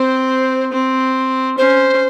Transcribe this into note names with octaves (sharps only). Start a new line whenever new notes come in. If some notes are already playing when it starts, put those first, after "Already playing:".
Already playing: C4 C5
C4
C#4 C5